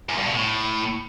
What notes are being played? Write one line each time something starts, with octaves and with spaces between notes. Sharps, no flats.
E2
G2
B2
A2